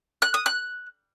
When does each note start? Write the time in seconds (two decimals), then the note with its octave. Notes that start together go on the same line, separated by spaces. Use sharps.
0.22 F#6
0.34 D#6
0.46 F#6